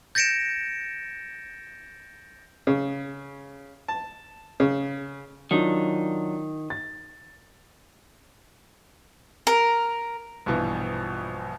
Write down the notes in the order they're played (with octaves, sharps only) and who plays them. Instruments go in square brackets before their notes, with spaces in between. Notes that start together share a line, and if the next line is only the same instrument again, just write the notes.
[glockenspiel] G6 A6 A#6 C#7 D7 E7
[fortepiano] C#3
A5
C#3
[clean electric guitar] D#3 [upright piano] F#3 D4 F4
[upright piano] A6
[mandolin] A#4
[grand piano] A#1 G2 B2 E3